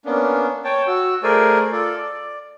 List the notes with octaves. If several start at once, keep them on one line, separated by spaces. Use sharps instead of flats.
A#3 B3 C#4 D4
C#5 G5 A5
F#4 E6
A3 G#4 A#4 C5 D5 G#5
F4 A4 D5
D5